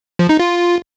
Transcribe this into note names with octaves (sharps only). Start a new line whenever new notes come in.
F3
D#4
F4